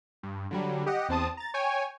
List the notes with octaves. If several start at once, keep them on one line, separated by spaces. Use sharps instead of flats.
G2
D3 F#3 G3
G4 D#5 F#5
E2 C4 A5 D#6
A#5 A6
C#5 G5 G#5